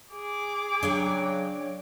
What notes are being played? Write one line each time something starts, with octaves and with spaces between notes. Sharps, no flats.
G#4 D6
C#3 F#3 D4 C#5 G5